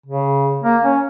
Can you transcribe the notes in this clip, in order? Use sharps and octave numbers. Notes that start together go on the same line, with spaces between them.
C#3
A#3
C#4